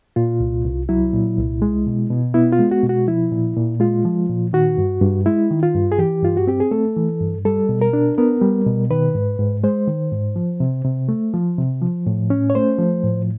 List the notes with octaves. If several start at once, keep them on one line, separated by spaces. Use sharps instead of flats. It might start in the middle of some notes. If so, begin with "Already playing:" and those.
A#2 F4
C2
C2
F#3 E4
A#2
C2
G#3
B2
B2
B3 E4
F4
G#3
F#4
B2
F#4
F3 E4
A#2
A#2
G#3 F4
F3
A#2
D#3 F#4
G2
G2
G#3 E4
D#3
F4
G2
G#4
E3 G4
G2 F4
F#4
C4 G4
G#4
A3 A4
E3
G2
G3 A4
B2
A#4
D4
B3 A#4
G3
B2
D#3 B4
G#2
G#2
G#3 C5
D#3
G#2
F3
C3
C3
A3
F3
C3
F3
A2
C#4
C#5
A3 C5
F3
A2